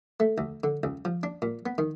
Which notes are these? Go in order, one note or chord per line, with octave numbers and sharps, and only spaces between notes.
A3
D2
D3
C#2
F3
D4
A#2
B3
D#3